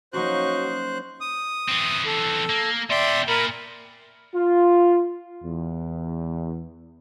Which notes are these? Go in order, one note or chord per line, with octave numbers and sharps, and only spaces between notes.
F#3 A#3 C#4 D#4 F#4 C5 C#6 F#6
D#6
E3 C4
A4
A#3
B2 D5 E5 G5 C6
A#2 A#4 B5
F4
E2